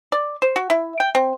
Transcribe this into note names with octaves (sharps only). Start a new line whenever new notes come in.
D5
C5
F#4
E4
G5
C4